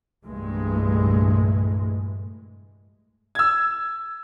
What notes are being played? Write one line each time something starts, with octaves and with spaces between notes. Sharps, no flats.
C2 G2 A#2 E3 G#3 A3
E6 G#6